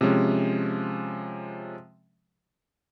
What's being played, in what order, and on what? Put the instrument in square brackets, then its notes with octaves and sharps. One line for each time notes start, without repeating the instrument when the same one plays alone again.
[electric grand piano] C3 F3 G#3 C#4